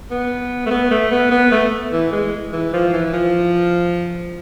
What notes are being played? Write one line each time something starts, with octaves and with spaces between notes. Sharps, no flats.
B3
A3
B3
A3
B3
B3
A3
E3
G#3
E3
F3
E3
F3